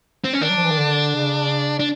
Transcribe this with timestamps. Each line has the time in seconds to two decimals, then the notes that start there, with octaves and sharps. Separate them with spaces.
0.24 C4
0.33 C#4
0.41 D#3 D4
0.50 F#3
0.56 F3
0.64 E3
0.71 D#3
0.78 D3
1.16 C#3
1.80 D4